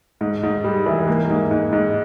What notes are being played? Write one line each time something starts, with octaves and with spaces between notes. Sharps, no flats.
G#2
G#2
G3
E3
A#3
G#2
G#2
G#2